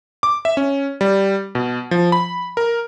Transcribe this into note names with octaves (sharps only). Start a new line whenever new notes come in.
D6
E5
C#4
G3
B2
F3
B5
A#4